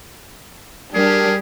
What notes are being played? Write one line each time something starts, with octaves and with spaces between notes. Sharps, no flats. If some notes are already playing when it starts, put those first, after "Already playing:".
G3 D4 G4 G#4 A#4